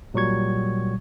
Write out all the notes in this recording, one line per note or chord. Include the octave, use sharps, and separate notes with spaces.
A#2 F#3 G3 C#6 G#6